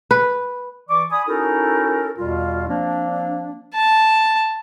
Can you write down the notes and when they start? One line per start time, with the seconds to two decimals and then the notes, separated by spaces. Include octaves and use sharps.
0.11 B4
0.89 E3 D5 C#6 D6
1.11 D5 G#5 B5 D#6
1.28 C#4 D#4 E4 F#4 A4 A#4
2.17 E2 B2 G3 F4
2.68 F3 A#3 C4 D4
3.74 A5